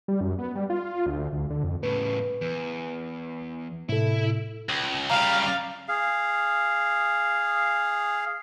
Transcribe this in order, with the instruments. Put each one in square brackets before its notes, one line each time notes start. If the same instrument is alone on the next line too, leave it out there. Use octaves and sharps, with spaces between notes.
[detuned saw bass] G3
F#2
B3
G3
F4
D2
D2
D3
F2
[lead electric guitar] A2 C#3 [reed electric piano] B4
[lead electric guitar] E2
[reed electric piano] A2 C3 A4 [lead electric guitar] E4
[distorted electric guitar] C#2
[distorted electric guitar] C#3 G3 [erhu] F5 [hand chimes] A#5
[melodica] G#4 F5